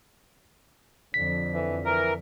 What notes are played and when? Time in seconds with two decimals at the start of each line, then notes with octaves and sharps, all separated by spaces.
1.14 F2 D3 B6
1.54 E3
1.85 E3 A#4